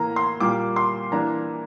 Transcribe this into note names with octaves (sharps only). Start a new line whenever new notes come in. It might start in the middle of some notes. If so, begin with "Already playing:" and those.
Already playing: A2 E3 A#3 A#5
C6
A#2 G3 A#3 D6
C6
E3 A#3 D4 A#5